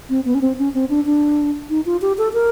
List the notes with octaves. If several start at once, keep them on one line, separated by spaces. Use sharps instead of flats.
C4
B3
C#4
C4
C#4
C4
D4
D4
D#4
F4
G4
A4
A#4